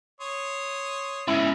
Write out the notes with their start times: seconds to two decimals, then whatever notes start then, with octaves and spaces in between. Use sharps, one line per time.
0.21 C#5 C6 D#6
1.28 G#2 C#3 E4